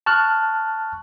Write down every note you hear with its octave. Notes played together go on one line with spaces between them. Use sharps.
A5 C#6 F6 F#6